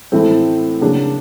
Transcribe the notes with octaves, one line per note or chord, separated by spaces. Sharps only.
A2 E3 A3 C4
C#3 F#3 A#3 D4